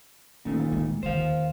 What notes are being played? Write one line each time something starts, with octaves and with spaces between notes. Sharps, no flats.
A#2 D#3 A3 C#4
G#3
D#2 D#3 C5 F5